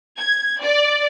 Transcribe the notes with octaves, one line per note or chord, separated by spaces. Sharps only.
G#6
D5